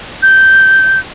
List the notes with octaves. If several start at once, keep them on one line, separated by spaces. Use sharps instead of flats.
G6